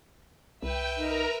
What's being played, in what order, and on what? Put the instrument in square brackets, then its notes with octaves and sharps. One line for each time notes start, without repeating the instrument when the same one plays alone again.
[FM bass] C2 [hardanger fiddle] B4 E5 [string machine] G5
[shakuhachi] D#4 [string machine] A#4 A#5